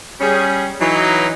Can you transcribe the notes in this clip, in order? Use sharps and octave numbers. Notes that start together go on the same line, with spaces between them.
G3 C#4 G#4
E3 F#3 D#4